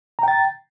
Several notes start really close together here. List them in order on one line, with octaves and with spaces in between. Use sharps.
A#5 G5 A6